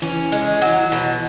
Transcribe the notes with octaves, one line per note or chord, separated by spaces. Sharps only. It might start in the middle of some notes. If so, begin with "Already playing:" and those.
E3 C#4
G#3
F#3
B2